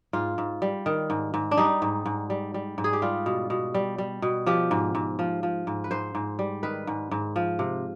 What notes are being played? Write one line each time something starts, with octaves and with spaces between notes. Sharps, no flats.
G#2 F4
G#2
G3
D#3
G#2
G#2
D4
G3 D#4
G#2
G#2
G3
G3
G#2
G#4
G4
G3 F4
B2
B2
G3
G3
B2
F3 G4
G#2
G#2
F3
F3
G#2
B4
G#2 C5
G#2
G3
D#3 B4
G#2
G#2
F3
C3